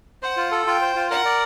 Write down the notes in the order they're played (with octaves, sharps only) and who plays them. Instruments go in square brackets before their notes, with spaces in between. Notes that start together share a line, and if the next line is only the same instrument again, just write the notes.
[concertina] C5 [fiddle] F#5
[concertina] F4
A4
[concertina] F4 [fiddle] G5
[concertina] C5
F4
[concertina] A#4 [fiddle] F#5
[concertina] D5